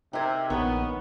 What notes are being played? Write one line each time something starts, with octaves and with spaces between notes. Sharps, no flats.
C3 D#4 A#4 G5 E6 G#6
A#1 D#3 B3 C#5 A#5